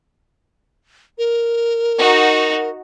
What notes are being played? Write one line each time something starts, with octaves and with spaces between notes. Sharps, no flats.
A#4
D#4 F#4